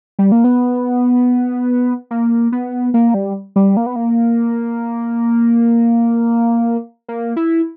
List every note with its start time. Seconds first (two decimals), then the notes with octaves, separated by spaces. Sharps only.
0.19 G3
0.32 A#3
0.44 B3
2.11 A#3
2.52 B3
2.94 A#3
3.14 G3
3.56 G3
3.77 A#3
3.86 B3
3.96 A#3
7.09 A#3
7.36 E4